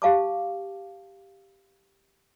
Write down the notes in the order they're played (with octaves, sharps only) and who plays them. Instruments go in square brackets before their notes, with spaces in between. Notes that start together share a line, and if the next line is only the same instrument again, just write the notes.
[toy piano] G4 F5 A5 D6